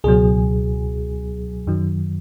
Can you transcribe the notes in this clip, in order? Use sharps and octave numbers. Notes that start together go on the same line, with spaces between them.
C#2 B2 F#3 G#4
F#2 D#3 F#3